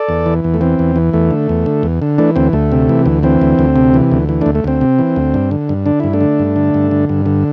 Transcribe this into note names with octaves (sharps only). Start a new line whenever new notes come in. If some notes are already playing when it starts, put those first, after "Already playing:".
Already playing: A4 D5
E2
E3
E2
A3
E3 C4
E2
E3
E2 A3
D3
E2
D3
E2
D3
E3 A3 D4
D2 C4
D2 A3
C3
E3
D2
E3 C4
D2
D2
C3
E3
D2
E3
A3 D4
D2
A3
D2 C4
C3
E3
D2
G2
D3
G2
D3 D4
G2 E4
A3 D4
D3
G2
D3
G2
D3
G2
D3